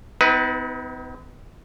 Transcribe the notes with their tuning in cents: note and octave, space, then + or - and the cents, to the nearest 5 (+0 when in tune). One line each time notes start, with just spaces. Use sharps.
B3 +45 D#4 +45 B4 +0